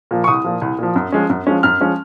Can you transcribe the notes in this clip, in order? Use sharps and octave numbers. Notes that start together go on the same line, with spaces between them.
A#2 F3
C#6
C2 D#6
A#2 F3
C2
A#2 F3
F#2
F3 G#3 C#4
F#2
F3 G#3 C#4
F#2 F6
F3 G#3 C#4